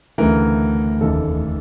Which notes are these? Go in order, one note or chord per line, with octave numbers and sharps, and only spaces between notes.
D2 C#3 E3 A#4
F1 D#2 C#3 E3 A4